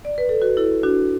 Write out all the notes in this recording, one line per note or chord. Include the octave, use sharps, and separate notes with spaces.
D5
B4
A4
F#4 B4
E4 A4
D4 F#4